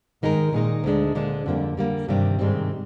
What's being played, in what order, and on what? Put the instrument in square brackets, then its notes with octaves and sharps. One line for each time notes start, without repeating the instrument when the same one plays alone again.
[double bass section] G#2 [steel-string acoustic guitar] D#3 G#3 D#4 A#4
[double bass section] A#2 [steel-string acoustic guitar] D#3 G#3 D#4 A#4
[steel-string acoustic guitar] D2 D3 G#3 D4
[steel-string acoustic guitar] D2 D3 G#3 D4 [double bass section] A#2
[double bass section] F2 [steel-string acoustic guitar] D3 G3 A#3
[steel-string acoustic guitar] D3 G3 A#3
[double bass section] G2 [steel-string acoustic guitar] C3 D#3 G3 C4
[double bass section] G#2 [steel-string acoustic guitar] C3 D#3 G3 C4